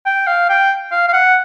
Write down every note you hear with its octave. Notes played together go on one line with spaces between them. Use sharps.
G5
F5
G5
F5
F5
F#5